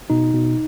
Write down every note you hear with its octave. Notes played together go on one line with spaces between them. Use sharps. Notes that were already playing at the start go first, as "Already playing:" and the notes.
B2 D#4
B2